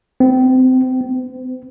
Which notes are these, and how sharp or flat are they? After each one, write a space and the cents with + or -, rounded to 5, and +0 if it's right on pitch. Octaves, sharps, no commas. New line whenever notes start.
C4 -25
C4 -45